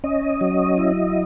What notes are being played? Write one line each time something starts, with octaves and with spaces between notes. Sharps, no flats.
C#4 D#5
F#3
E4